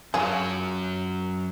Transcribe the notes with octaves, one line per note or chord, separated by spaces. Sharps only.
F#2 F#3 F4 F#4 G#4